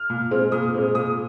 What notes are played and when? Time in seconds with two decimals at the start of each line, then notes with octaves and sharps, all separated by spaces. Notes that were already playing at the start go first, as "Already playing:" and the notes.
Already playing: F6
0.10 A#2
0.31 G#3 C4
0.52 A#2 D#6
0.75 G#3 C4
0.95 A#2 D#6